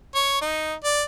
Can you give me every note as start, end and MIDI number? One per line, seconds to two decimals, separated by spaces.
0.15 0.41 73
0.41 0.74 63
0.84 1.03 74